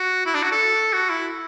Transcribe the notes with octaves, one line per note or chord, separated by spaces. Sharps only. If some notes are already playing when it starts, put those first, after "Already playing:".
Already playing: F#4
E4
D4
F#4
A4
F#4
E4